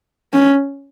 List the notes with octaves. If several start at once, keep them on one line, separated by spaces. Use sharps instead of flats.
C#4